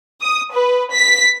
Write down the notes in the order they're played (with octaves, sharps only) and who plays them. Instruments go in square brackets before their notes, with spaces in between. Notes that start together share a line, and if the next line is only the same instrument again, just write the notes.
[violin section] D#6
B4
B6